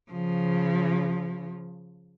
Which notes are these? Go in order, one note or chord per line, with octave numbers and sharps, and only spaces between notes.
C#3 F3